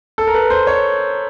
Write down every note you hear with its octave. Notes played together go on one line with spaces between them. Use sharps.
A4
A#4
B4
C5
C#5